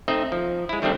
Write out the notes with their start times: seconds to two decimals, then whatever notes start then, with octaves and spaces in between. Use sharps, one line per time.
0.08 A3 C4 D#4 D#5 E5
0.32 F3
0.69 G#3 E4
0.82 D#3 G3 A3 C4 D4